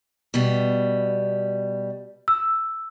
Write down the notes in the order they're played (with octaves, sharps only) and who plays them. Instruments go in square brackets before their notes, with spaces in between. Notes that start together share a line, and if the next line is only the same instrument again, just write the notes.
[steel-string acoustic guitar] B2 G3
[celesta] E6